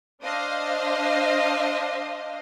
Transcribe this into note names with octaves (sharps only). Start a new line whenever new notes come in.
D4 C5 D#5 F5